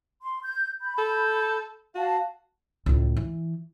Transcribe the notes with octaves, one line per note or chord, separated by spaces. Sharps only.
C6
G6
B5 G6
A4
F#4 F5 A5
C#2 A2
E3